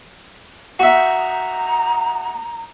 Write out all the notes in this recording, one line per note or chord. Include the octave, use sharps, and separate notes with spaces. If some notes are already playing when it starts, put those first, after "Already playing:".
F#4 E5 A#5